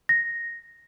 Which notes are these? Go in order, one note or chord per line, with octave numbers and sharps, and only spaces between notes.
A#6